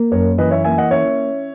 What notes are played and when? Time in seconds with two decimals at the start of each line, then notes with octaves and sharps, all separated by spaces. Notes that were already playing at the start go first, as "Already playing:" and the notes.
Already playing: A#3
0.12 F#2 A#4 C#5
0.38 E3 B4 D#5
0.51 C#5 E5
0.64 A#3 E5 G#5
0.78 D#5 F#5
0.91 C#4 C#5 E5